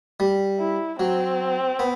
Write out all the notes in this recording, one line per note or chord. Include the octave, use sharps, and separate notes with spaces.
G3
E4
F#3 C4
B3